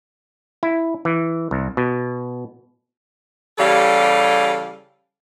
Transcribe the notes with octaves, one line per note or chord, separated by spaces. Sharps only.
E4
E3
C2
B2
C#3 E3 G3 G4 A4 F5